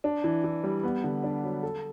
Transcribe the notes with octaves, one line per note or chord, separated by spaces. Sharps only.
D4
E3
E3
G3
B3
D3
D4
F#3
A4